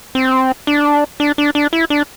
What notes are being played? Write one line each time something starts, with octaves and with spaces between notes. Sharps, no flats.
C4
D4
D4
D4
D4
E4
D4